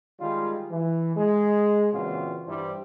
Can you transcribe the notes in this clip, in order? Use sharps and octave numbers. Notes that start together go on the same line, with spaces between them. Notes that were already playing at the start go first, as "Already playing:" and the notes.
D#3 G3 G#3 D#4 F4
E3
G#3
A#2 C#3 E3 C4 F4 F#4
G2 E3 G3 D4 E4 C5